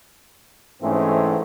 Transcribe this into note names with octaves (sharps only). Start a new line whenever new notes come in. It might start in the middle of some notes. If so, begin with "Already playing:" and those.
G#2 E3 A3 C4 C#4